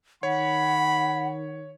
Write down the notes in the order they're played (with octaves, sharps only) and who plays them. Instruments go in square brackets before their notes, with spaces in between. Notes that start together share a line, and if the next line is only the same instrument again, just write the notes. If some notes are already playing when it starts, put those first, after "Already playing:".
[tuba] D#3 [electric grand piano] C#5 [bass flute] F#5 [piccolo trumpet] B5